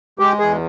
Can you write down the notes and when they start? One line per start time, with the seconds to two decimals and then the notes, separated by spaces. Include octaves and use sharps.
0.19 G#3 G4
0.39 E2 G#4